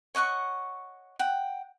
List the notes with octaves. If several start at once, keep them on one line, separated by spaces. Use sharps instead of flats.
C#5 D#5 F#5 C#6
F#5 G5